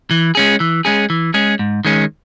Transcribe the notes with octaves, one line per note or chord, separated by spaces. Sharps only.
E3
G#3 C#4 G#4
E3
G#3 C#4 G#4
E3
G#3 C#4 G#4
G#2
D#3 G#3 C#4